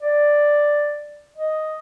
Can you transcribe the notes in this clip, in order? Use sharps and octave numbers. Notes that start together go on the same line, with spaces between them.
D5
D#5